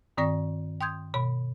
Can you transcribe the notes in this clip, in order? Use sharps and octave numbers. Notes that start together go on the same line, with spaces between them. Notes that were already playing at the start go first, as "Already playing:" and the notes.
G2 D#3 C4 D5 C#6 A#6
G5 C6 D#6 G6 G#6
B2 C#5 B5